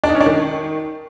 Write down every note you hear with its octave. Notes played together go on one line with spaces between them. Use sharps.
D4
D#4
C#4
D4
D#3